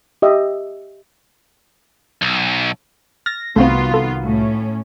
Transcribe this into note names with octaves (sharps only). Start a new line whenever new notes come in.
G4 D#5 E5
B1
F6 A6 A#6
C2 D#3 A3 B3 C4 F4 F#4
A4
A2 C#4